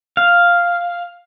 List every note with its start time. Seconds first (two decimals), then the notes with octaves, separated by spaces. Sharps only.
0.17 F5